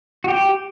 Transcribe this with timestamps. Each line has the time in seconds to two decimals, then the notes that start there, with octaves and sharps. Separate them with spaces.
0.24 F#4
0.28 G4